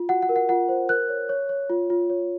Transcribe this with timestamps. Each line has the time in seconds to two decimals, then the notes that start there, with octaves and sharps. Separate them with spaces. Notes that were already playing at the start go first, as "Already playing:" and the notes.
Already playing: F4
0.09 F#4 F#5
0.22 F#5
0.29 A#4
0.36 F#5
0.49 F4 F#5
0.69 C5
0.89 A#4 F#6
1.09 C#5
1.29 C#5
1.49 C#5
1.70 F4
1.90 F4
2.10 C#5